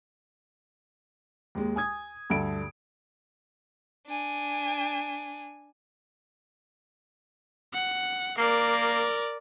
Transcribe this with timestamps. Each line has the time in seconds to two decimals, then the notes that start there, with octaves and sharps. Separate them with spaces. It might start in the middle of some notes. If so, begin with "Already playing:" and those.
1.55 D#2 G#3
1.76 G#5 D#6 G#6
2.30 D2 G2 A4 D7
4.07 D4 G#5
7.74 F#5
8.38 A#3 A#4 D5